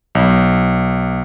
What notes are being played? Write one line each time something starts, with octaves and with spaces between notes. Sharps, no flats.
B1